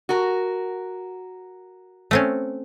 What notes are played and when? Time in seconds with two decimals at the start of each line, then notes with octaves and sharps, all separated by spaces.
0.09 F#4 A#4
2.11 A3 C4 C#4